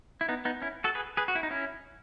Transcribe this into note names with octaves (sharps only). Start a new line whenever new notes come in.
E4
B3 D#4
B3 D#4
C#4 E4
F#4 A4
G#4 B4
G#4 B4
F#4
E4
D#4
C#4 E4